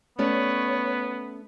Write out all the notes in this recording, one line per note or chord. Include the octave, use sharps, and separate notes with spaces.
A3 B3 C#4 C#5 D5